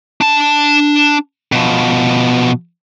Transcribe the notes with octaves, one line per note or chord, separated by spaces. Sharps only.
D4 A5
B2 F3